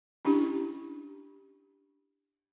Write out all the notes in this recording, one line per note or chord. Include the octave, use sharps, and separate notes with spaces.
C#4 D4 E4 G4